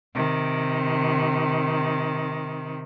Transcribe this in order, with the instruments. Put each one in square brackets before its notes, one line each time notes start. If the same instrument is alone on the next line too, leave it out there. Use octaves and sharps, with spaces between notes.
[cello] C3 D#3